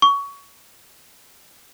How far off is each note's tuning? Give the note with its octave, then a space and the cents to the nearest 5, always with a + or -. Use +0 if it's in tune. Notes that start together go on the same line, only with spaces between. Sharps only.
C#6 +20